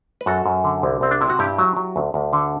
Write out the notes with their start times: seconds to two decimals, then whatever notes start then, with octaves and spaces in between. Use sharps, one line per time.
0.21 B4
0.26 F#2 F#4 A4
0.46 F#2
0.64 D3
0.83 C2
1.01 C2 C4
1.11 D4
1.21 C3 E4
1.30 F#4
1.39 G2 E4 G4
1.58 F#3
1.77 F#3
1.96 D2
2.14 D2
2.33 D3